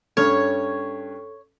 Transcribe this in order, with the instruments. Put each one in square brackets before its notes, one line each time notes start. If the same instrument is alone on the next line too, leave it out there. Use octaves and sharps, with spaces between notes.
[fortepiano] G2 C#4 F6 [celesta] A4 [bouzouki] C#5